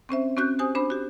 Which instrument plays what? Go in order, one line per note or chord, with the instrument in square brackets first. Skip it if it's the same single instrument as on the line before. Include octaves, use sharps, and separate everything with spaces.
[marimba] C4 C#4 C5 E5
C4 C#4 F#4 F#6 G6
G4 C5 G#5 D#6
D4 C5 B5
F#4 G4